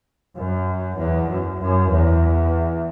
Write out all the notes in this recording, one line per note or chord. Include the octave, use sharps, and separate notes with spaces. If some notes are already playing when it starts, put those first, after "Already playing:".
F#2
E2
F#2
F#2
E2